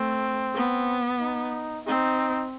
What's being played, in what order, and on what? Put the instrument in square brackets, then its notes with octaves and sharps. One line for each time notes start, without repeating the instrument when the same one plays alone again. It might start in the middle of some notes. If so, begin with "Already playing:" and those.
Already playing: [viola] A3 [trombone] C4
[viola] B3
[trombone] D#4
[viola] C4 [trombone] D#4